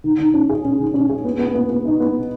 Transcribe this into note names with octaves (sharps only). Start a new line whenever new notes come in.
D#3
D#3
C#4
G#4
C#4
D#3
C#4
G#4
B3
B3
B3
B3
D#4
B3